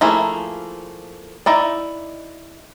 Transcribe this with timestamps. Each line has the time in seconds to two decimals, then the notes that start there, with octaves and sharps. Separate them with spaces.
0.01 F3 A3 A#3 E4 G#4
1.46 D#4 E4 D5